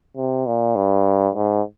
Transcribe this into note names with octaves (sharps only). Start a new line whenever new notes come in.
C3
A#2
G2
G#2